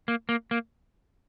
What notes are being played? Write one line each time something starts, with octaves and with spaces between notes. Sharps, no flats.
A#3
A#3
A#3